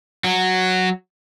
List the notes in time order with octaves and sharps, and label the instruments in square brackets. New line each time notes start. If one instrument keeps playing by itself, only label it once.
[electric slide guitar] F#3